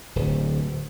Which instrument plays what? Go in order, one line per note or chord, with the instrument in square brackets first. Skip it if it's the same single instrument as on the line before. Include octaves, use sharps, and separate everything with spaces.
[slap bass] D1